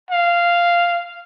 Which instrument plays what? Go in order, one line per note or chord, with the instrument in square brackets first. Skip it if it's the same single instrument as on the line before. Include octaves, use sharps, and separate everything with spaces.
[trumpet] F5